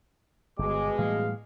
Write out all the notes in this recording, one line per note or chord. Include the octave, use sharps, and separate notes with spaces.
G1 B2 G#3 D6
A2 E3 G3 F5